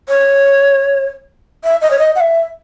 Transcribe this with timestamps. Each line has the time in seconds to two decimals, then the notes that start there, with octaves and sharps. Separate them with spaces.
0.09 C#5
1.64 E5
1.82 D#5
1.91 C#5
1.99 D#5
2.16 F#5
2.20 E5